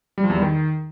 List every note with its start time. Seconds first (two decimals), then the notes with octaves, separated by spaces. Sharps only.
0.18 G3
0.24 F3
0.30 E2
0.36 G3
0.42 D#3